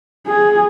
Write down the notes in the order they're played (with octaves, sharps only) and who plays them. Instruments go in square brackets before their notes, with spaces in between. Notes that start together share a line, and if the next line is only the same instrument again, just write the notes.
[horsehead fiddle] G#4